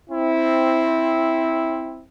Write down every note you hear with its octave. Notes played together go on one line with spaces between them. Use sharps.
C4 E4